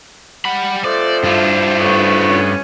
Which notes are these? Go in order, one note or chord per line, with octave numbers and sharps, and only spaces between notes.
G3 F#5 B5
F2 F3 A3 C5 D5
G2 D4 E4 F4
C#3 A3 B3
C#4